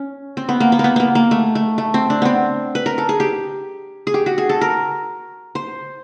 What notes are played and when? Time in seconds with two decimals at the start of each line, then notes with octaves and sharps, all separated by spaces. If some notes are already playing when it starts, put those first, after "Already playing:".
Already playing: C#4
0.37 C4
0.49 B3
0.60 A#3
0.72 B3
0.79 A#3
0.84 B3
0.96 A#3 B3
1.15 A#3
1.31 A3
1.55 A3
1.78 A3
1.94 C4
2.10 D4
2.22 B3 C4
2.75 B4
2.86 A#4
2.98 A4
3.09 G#4
3.20 G4
4.07 G#4
4.14 G4
4.26 F#4
4.38 G#4
4.49 A4
4.61 A#4
5.55 C5